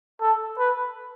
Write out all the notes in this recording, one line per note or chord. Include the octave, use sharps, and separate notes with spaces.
A4
B4